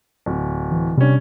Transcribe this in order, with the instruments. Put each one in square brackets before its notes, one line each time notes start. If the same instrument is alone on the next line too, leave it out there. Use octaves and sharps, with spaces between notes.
[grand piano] D1
[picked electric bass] E3
[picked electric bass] C3 D4 [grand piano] G3 C#4